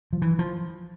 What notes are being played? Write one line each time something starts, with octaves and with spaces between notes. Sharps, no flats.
F3
E3
F3